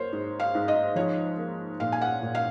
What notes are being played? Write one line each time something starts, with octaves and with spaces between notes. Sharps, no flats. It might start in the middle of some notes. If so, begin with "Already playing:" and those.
Already playing: F#3 A#3 C5 C#5
G#2
F5
G#2
D#5
F3 C#5
A#3
A#2 F5
G#5
F#5
A#2
F5